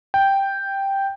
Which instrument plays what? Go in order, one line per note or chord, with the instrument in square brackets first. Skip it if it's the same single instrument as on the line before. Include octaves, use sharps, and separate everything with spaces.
[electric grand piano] G5